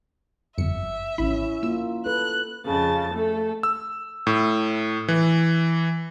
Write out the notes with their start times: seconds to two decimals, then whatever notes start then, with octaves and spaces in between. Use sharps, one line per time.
0.58 G1 F2 E5 C#7
1.18 A1 C#4 E4 B5
1.63 A#3 F4 E6
2.06 A4 B4 F#6
2.66 F2 C#3 A5 A6
3.14 A3 A4
3.63 E6
4.27 A2
5.08 E3